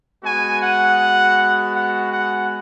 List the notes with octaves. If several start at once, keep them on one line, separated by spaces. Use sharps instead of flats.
G#3 B3 F#4 G#5
F#5
F#5
F#5